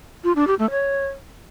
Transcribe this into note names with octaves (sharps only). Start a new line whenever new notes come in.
F4
D4
G4
A3
C#5